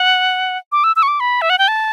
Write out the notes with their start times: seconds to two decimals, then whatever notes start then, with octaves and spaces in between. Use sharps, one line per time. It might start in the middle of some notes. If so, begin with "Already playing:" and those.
Already playing: F#5
0.72 D6
0.84 E6
0.96 E6
1.03 C#6
1.08 D6
1.20 B5
1.42 E5
1.50 F#5
1.58 G5
1.68 A5